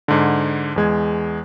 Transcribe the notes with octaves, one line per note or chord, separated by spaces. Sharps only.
G#2 D3
E2 G#3 G#6